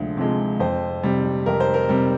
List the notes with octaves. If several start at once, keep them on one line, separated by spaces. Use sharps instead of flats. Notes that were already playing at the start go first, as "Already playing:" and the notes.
Already playing: D2 C3 F3 G#3
C3 F3 G#3
F2 C5
C3 G3
F2 A#4
C5
A#4
C3 G3